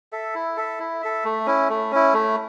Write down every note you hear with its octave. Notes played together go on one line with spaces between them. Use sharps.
A4 E5
E4
A4 E5
E4
A4 E5
A3
C#4 E4
A3
C#4 E4
A3